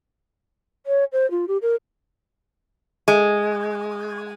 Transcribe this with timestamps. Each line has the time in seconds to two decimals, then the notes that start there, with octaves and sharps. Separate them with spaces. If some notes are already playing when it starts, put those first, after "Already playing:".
0.86 C#5
1.12 C5
1.31 F4
1.48 G4
1.62 A#4
3.08 G#3